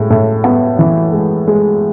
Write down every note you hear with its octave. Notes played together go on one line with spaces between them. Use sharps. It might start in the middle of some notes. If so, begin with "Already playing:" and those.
Already playing: A2 G#3
A2
B3
E3
G#3
G#3